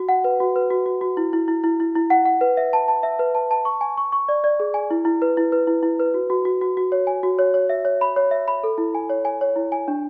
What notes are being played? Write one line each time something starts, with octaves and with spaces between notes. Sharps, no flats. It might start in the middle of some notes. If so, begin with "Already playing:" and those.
Already playing: F#4
F#5
B4
F#4
B4
F#4
F#4
F#4
E4
E4
E4
E4
E4
E4
F#5
F#5
B4
E5
A5
A5
E5
B4
A5
A5
C#6
G#5
C#6
C#6
D5
D5
G#4
G#5
E4
E4
B4
E4
B4
E4
E4
B4
F#4
F#4
F#4
F#4
F#4
C#5
G#5
F#4
C#5
C#5
E5
C#5
B5
C#5
E5
B5
A4
E4
G#5
C#5
G#5
C#5
E4
G#5
D4